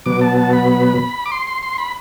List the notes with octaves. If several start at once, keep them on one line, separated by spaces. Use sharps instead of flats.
B2 F#3 B3 D6
A5
A5
B5
D6
C6
C6
C6
B5